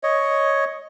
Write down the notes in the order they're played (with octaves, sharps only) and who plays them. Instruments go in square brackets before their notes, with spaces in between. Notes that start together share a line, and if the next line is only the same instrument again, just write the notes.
[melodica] C#5 D#5